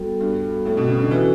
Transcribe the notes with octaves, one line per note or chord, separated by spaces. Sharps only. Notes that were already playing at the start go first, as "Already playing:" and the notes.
Already playing: G3 B3 F#4 A4
G2
A2
B2
C#3
D3
E3 C#4 F#4 A4